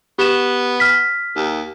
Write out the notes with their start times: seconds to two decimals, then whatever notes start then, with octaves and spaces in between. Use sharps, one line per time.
0.19 B3 G4 E7
0.80 F6 B6
1.36 D#2